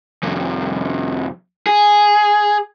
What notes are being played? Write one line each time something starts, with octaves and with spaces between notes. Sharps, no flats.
C2 F2
G#4